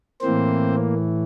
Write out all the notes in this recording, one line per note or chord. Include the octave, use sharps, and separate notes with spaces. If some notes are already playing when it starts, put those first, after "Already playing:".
A2 E3 A#3 C4 C5